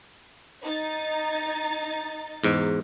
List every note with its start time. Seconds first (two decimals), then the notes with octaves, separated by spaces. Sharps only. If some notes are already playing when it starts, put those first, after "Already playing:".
0.63 D#4 A6
2.44 E2 G#2